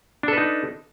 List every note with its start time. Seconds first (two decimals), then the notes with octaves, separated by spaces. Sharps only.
0.23 D4
0.28 A4
0.33 B4
0.38 D#4